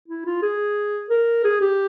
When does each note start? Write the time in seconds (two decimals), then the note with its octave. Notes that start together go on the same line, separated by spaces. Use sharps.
0.08 E4
0.25 F4
0.42 G#4
1.10 A#4
1.45 G#4
1.61 G4